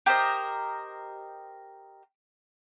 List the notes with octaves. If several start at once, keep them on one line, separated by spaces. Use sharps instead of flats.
G4 A#4 C5 D#5